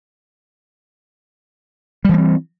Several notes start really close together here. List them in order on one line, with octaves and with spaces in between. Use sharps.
G3 E3 A#3 C4